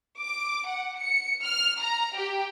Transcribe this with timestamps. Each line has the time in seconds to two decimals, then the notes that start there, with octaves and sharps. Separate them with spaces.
0.20 D6
0.66 F#5
0.98 C#7
1.43 F6
1.79 A#5
2.16 G4